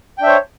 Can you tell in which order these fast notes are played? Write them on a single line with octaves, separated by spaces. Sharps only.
G5 D4 E5 C5 C#5